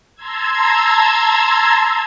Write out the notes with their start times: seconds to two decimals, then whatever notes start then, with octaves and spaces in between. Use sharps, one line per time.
0.15 A5 A#5 C6 E6 G#6